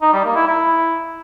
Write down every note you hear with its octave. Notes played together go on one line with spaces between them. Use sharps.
D#4
G3
A#3
E4
E4